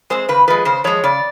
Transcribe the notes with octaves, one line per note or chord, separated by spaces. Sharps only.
G#3 C4 C5
C#3 B4
F3 G#3 B4
C#3 C5
F3 G#3 C#5
C#3 D5